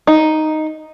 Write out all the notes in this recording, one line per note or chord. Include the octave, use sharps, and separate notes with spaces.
D#4